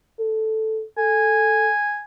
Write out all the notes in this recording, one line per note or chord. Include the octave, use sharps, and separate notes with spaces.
A4
A4 G#5